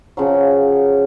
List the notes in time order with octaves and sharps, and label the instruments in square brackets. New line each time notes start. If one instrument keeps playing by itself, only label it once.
[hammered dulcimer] C#3 F3 F#3